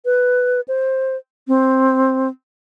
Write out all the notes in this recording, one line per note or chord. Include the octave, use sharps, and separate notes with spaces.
B4
C5
C4